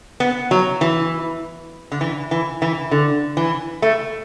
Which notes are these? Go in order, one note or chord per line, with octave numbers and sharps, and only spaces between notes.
B3
F#3
E3
D3
E3
E3
E3
D3
E3
A3